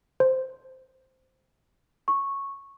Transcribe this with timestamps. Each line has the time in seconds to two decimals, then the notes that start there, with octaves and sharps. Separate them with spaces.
0.20 C5
2.08 C#6